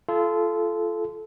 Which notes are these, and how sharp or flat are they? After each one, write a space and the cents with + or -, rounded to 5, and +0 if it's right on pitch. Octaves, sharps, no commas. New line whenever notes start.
F4 -25 A4 -20